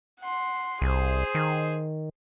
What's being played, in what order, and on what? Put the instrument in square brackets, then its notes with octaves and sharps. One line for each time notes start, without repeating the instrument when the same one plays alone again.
[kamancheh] F#5 C6
[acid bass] C2 [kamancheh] G#4 C5
[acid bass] D#3